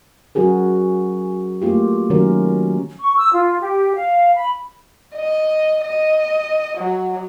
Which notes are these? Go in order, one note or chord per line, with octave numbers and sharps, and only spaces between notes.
F#3 C#4 F#4 G#4 A#4
A3 A#3 F4 G4
D#3 F#3 C#4 A#4
C#6
E6
F4
G4
F5
B5
D#5
D#5
F#3